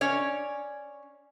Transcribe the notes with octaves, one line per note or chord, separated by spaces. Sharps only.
C#4 C#5 D5